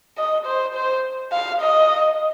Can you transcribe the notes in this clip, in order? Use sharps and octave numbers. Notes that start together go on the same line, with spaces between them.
D#5
C5
C5
F5
D#5